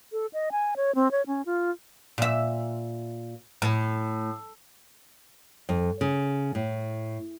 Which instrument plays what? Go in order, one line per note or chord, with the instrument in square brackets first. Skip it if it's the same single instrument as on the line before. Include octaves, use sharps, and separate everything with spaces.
[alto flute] A4
D#5
G#5
C#5
C4
C#5
C#4
F4
[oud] A#2 E5
A2
[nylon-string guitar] F2
C#3
A2